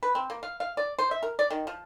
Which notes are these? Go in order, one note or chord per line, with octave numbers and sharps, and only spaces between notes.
B4
C4
A#3
F5
F5
D5
C5
E5
A#4
D5
D#3
F3